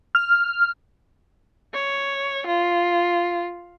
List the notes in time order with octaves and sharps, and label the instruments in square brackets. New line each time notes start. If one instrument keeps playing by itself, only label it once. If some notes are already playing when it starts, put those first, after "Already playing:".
[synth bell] F6
[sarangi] C#5
F4